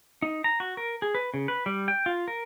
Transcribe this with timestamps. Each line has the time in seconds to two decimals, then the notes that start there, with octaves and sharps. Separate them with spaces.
0.22 D#4
0.44 A#5
0.60 F#4
0.77 A#4
1.02 G#4
1.15 B4
1.34 C#3
1.48 B4
1.66 G3
1.88 G5
2.06 F4
2.28 A#4